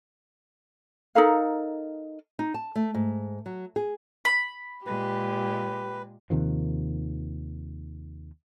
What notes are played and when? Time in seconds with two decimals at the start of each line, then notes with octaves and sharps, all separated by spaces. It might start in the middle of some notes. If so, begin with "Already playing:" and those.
1.15 D#4 A4 A#4 F5
2.39 D#4
2.54 A5
2.75 A3
2.94 G#2
3.46 F#3
3.76 G#4
4.25 B5
4.86 A#2 G#3 G4 B4
6.30 D#2 C3 D#3 F3